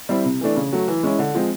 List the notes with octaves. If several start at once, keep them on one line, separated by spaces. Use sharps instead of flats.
G3 C4 E4
C3
E3 A3 D4
C#3
F#3 A3
E3
G#3 C#4 E4
D3
F3 G#3 C4